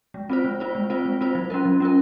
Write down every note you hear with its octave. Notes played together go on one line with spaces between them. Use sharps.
G#3
C4 F4 C5
G#3
C4 F4 C5
G#3
C4 F4 C5
G#3
C4 F4 C5
F#3
C#4 F4 A#4
F#3
C#4 F4 A#4